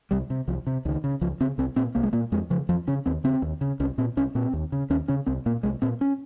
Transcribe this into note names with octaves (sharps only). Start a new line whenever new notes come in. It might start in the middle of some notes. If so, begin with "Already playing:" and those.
C2 G3
C3
C2 F3
C3
C#2 D#3
C#3
C#2 F3
C#3 C4
C2 C4
A#2 C4
C2 A#3
G#3
A#2 A#3
F2 G#3
C#3 F3
F2 F3
C#3 C#4
D#2 C4
C#3 C4
D#2
C#3
C2 C#4
A#2 C4
C2 C#4
A#2 C4
D#2
C#3
D#2 C#4
C#3 C#4
C2 C4
A#2 A#3
C2 G#3
A#2 C4
C#4